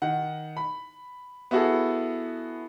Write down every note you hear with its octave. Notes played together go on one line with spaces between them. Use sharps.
D#3 F#5
B5
B3 E4 F#4 G#4 A4